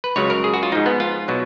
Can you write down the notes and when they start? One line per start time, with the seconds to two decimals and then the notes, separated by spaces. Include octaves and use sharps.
0.04 B4
0.16 C#2 C#3 F#3 C#5
0.30 A#4
0.44 G#4
0.54 F#4
0.63 F4
0.72 G#2 F3 D#4
0.86 B3
1.00 F4
1.28 B2 F#3